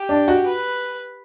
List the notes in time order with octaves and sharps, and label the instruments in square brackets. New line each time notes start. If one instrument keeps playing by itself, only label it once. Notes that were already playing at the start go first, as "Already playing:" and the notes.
Already playing: [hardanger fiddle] G4
[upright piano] D4
F#4
[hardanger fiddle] B4